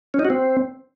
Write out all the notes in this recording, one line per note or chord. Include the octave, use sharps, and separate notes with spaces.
C#4
D#4
F#4
C4